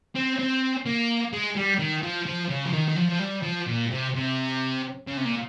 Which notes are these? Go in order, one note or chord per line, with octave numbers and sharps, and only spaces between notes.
C4
C4
A#3
G#3
G3
D#3
F3
F3
C#3
F3
D#3
D#3
F3
F3
G3
F3
A#2
C3
C3
C#3
C3
A#2